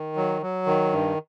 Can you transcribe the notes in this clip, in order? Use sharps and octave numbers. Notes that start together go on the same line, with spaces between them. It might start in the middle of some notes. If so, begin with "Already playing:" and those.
Already playing: D#3
F#3
F#3
D#3
G2